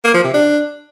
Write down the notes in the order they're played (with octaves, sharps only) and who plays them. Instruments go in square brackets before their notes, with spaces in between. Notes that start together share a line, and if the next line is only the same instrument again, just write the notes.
[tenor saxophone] A#3
F3
C3
D4